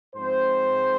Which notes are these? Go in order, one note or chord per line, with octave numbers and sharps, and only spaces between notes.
G#2 F3 G#3 C4 C5